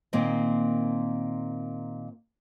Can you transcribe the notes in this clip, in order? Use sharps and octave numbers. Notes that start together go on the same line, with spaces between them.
A#2 D#3 A#3 C4 D#5